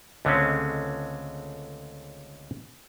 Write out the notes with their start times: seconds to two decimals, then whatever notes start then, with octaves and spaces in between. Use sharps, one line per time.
0.25 C#2 D3 G#3 A3 C4 C#4